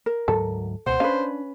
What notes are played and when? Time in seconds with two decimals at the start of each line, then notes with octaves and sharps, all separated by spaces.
0.06 A#4
0.28 D2 G#2 F#3 A4
0.86 C#2 B2 C5 F#5
1.00 C#4 D4 B4 F5